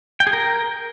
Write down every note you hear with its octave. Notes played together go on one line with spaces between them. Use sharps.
G5
G#4
A#4